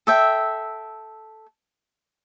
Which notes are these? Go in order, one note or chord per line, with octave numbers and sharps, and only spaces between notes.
A4 E5 G5